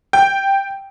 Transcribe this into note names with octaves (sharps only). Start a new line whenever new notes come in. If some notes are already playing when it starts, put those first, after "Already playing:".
G5